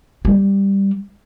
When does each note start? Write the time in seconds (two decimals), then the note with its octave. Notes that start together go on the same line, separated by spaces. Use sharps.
0.25 G3